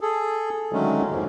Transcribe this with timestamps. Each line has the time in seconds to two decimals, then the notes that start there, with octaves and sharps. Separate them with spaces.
0.01 G#4 A4
0.73 D3 D#3 F#3 G#3 A3 C#4
1.11 F2 G#2 C3 A#3